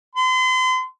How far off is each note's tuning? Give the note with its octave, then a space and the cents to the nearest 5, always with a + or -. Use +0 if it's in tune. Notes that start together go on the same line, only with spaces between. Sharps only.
C6 -40